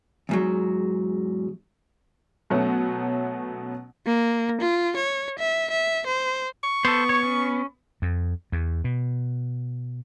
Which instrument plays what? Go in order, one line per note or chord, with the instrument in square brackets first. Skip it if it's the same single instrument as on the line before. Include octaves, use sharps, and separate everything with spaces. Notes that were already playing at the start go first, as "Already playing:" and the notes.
[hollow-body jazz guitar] E2 G#2 F#3
[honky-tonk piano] B2 F#3 A3 B3 C#4
[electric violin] A#3
F4
C#5
E5
E5
C5
[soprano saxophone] C#6
[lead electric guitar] B3 [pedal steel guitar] A4 C5
[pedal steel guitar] C#5
C#4
[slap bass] F2
E2
B2